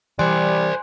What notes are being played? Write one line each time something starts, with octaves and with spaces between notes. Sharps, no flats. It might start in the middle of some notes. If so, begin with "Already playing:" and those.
E3 G3 C5 D5 G#5 C6 F#6